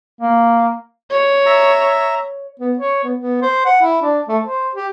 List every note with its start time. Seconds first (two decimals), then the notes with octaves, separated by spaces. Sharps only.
0.21 A#3
1.11 C#5
1.46 E5 A#5
2.60 B3
2.78 C#5
3.04 B3
3.17 B3
3.42 C5
3.65 F#5
3.82 E4
4.02 D4
4.28 A3
4.44 C5
4.75 G4